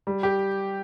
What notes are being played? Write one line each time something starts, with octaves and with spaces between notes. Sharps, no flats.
G3
G4